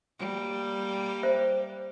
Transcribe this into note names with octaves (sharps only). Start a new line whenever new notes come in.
G3 A#3
C5 E5